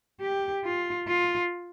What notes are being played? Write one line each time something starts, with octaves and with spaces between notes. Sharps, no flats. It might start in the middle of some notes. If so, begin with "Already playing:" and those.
G4
F4
F4